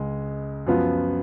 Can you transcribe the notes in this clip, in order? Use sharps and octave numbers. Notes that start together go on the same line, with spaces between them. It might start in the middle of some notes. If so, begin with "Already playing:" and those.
Already playing: C#2 C#3 G#3
F#2 F3 B3 F4